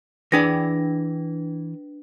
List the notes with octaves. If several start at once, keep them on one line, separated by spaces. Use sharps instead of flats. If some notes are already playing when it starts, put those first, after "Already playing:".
E3 D4 G#4 B4 D5 A#6